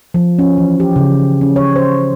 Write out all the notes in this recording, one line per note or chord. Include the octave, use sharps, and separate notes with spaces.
F3
C#4
E3
G4
C#3
C#4
C#5
C5